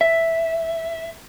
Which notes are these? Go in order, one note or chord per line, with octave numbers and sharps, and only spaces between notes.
E5